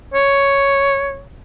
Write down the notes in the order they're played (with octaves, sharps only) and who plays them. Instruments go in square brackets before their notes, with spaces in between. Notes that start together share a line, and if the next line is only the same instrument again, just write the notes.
[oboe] C#5